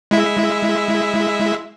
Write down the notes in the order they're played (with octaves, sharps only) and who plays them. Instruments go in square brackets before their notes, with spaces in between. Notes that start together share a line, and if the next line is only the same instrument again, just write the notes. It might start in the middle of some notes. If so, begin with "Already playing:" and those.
[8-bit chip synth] G#3 E4 E5